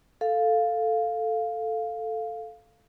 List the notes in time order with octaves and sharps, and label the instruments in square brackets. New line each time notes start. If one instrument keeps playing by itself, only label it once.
[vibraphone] A4 F5